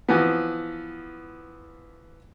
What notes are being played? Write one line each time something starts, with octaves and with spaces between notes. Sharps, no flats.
E3 F3 B3